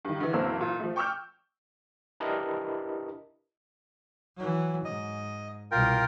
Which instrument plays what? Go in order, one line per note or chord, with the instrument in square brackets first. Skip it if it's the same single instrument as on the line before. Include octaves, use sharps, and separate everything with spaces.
[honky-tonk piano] G2 D#3
D3 E3
F#1 B1 E3 A#3 C4 E6
A#2
F3 A3
G5 C#6 D6 E6 F6 G6
[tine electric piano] D4 E4 G4 A#4 B4 D#5
[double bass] E3 F#3
[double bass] G#2 [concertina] D#5
[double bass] C2 B2 [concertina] F4 A#4 G5